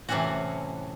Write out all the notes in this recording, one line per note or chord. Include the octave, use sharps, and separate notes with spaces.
A2 C3 E3 F#3 C#4 F#4